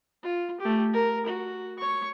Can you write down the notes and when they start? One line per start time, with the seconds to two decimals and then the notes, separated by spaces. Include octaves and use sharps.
0.23 F4
0.60 A3 G4
0.93 A#4
1.27 F#4
1.79 C#5 C#6